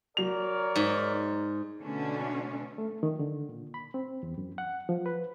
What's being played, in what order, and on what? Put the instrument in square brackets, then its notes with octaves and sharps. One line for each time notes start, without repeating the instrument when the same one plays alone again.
[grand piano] F#3 F7 [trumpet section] A#4 C#5 D5
[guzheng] G#2
[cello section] B2 D3 A3 C#4 D4
[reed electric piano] A3
D#3
D3
A#2
B5
C4
E2
F#2
F#5
F3
B4